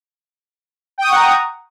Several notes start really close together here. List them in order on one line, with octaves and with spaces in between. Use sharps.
G5 D#6 C#6 F#5 A#5